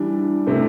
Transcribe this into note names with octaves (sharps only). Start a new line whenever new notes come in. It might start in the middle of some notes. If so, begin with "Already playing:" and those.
Already playing: E3 G3 D4
C3 A3 C4 E4